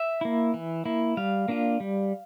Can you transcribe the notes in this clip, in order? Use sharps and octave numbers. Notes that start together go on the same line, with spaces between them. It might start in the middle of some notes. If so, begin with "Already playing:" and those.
Already playing: E5
A#3 E4
E3
A#3 E4
G3 F5
A#3 D4 F4
G3